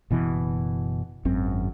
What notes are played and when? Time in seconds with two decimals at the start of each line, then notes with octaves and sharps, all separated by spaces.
0.10 F#1 B2 E3
1.25 G#1 F#2 C4